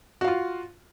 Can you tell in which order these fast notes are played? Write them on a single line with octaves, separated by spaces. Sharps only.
F#4 F5 F4